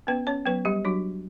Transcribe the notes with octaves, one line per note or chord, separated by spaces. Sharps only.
B3 C#4 B4
C#4 C#5
F#3 B3 B4
G3 G4
F#3 D4 F#4